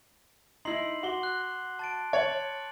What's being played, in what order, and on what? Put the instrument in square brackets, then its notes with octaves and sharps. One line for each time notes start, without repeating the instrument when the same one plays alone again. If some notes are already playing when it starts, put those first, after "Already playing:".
[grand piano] D#4 E4 [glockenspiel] C6 C7 F#7
[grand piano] F#4 [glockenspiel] C6 D6 G7
[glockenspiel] D6 F#6
A5 A6 D7
[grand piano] C#5 [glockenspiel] A6 F#7